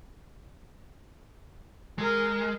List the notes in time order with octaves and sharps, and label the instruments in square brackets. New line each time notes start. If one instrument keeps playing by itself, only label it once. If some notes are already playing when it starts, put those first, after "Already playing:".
[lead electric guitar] G#3 [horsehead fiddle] G#4 A#4